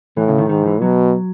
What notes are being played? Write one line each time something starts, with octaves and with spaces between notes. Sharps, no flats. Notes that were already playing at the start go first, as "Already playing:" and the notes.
A2 E3
C#3
D#3
G#2 D#3
E3
B2 F#3